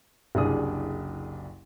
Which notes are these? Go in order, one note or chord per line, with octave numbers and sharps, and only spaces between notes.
F#1 C2 D4 G#4 D#6